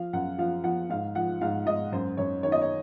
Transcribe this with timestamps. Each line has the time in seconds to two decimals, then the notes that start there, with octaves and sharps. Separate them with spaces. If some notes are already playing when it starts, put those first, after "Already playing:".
Already playing: F3 F5
0.13 F#2 F#5
0.38 F3 F5
0.64 F3 F#5
0.90 G#2 F5
1.15 F3 F#5
1.41 G#2 F5
1.66 G#2 D#5
1.92 F#2 C5
2.17 F#2 C#5
2.43 D#3 C#5
2.52 D#5
2.61 C#5